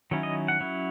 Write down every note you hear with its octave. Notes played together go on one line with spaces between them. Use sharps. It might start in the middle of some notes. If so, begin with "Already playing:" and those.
D#3 F#3 C#4 E4
D#5
F#5
F#3 C#4 E4